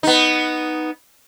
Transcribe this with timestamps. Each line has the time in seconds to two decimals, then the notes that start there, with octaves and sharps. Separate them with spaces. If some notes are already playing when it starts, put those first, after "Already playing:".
0.03 B3 D#4